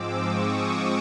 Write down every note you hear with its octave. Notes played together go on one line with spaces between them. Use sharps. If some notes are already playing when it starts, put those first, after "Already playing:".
Already playing: G#2 F3 G#3 C4 D6 E6
C#6 D#6